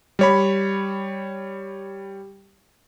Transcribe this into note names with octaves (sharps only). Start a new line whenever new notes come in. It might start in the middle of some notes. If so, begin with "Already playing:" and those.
G3 C#5 B5